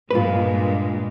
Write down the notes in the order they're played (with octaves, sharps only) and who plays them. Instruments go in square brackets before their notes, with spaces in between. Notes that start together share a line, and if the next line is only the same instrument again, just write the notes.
[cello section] G2 A#2 G#3 [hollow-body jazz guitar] F4 B4